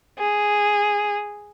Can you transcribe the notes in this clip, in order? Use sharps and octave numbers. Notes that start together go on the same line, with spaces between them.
G#4